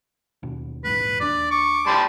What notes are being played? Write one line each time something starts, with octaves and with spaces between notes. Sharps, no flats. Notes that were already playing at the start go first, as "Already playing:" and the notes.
D#2 B2
A#1 E2 G#2 B4
D#2 D4 D5
C#6 D6
G3 A5 C6